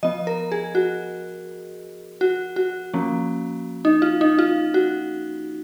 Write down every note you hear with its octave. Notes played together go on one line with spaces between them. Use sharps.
F3 B3 D#5
A#4
G#4
F#4
F#4
F#4
F3 A#3 C#4
D#4
F4
D#4
F4
F#4